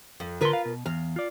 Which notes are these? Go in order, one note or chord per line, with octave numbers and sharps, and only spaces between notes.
F2
D3 F4 A#4 B4 C6
F5
B2
E2 F5
F4 D5